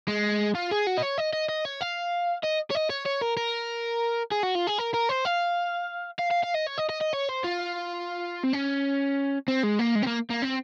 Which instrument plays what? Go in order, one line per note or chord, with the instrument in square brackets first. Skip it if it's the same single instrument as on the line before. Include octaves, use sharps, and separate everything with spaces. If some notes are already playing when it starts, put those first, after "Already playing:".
[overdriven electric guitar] G#3
F4
G#4
F#4
D#5
C#5
D#5
D#5
D#5
C#5
F5
D#5
C#5
D#5
C#5
C#5
A#4
A#4
G#4
F#4
F4
G#4
A#4
A#4
C5
F5
F5
F5
F5
D#5
C#5
D#5
D#5
D#5
C#5
C5
F4
C4
C#4
C4
G#3
A#3
G#3
C4
A#3
A#3
C4